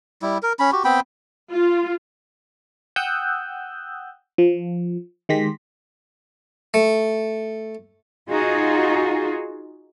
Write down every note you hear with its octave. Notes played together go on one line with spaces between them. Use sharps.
G3 E4
A#4
C#4 B5
F#4 G4
B3 C4 G5 B5
F4
F#5 G5 D#6 E6 F#6 G6
F3
D#3 G#3 G4 C6 A#6 B6
A3
D#4 F4 F#4 G#4